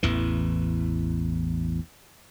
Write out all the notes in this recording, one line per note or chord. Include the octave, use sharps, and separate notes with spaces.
A1 E2 E3